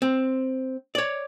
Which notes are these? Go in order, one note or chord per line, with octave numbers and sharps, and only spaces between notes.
C4
C#5 D5